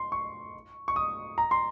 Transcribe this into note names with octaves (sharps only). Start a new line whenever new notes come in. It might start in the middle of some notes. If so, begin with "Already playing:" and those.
Already playing: C6
C#6
C#6
D#6
A#5
C6